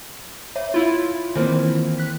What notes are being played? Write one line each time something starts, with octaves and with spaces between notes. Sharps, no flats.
C#5 E5
E4 F4
D#3 E3 A#3 C4
F#6 B6